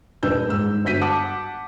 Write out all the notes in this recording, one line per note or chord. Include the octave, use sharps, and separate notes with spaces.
D#1 B4 E6 G6
G#2 E6
G1 F#4 G6 B6 D#7
F#5 A5 D6